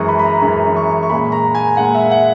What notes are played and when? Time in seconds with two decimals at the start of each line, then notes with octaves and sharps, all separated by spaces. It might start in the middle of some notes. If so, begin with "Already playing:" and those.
Already playing: F#2 E3 G#3 C#6 D#6
0.08 B5
0.19 B5
0.25 A#5
0.42 F#2 E3 G#3 B5
0.76 C#6
1.03 C#6
1.09 A#2 G#3 B5
1.32 A#5
1.55 G#5
1.77 A#2 G#3 F#5
1.95 E5
2.11 F#5